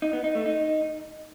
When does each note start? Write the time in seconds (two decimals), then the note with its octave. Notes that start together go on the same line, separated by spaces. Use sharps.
0.02 D#4
0.13 B3
0.24 D#4
0.35 A3
0.46 D#4